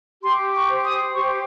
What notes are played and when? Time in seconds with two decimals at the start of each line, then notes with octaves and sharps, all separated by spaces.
0.22 G4 C6
0.53 C#6
0.69 C5
0.84 D#6
1.14 G4 C#6